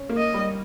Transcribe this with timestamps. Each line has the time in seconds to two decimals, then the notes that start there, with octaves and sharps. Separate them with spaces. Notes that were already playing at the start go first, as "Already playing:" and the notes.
Already playing: C#4
0.09 A#3
0.17 D#5
0.34 G3